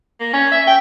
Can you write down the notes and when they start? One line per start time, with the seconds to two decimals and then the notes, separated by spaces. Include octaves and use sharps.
0.20 A#3
0.33 C#4
0.52 E5
0.67 G5